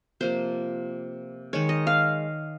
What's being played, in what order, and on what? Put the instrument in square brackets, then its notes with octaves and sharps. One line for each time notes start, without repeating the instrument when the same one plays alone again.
[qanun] C3 F3 A#3 C5
D#3 G#3 C#5
D#5
F5